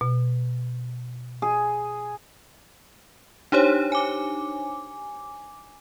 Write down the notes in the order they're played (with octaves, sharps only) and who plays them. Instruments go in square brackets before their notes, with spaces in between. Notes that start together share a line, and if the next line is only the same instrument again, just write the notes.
[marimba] B2
[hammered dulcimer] G#4
[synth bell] D4 D#4 G4 C5 C#5
G#5 D6